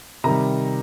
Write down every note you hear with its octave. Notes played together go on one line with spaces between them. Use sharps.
C3 D#3 G3 A#5